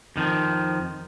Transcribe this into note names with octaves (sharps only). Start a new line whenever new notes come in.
F2 D#3 F3